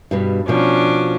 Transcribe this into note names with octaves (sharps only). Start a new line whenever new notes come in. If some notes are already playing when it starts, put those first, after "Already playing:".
G2 B2 G3
B2 F3 C#4 D4